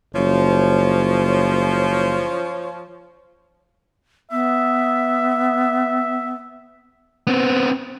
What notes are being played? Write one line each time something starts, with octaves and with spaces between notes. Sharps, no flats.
F#1 F3 C#5
B3 E5
B3 C4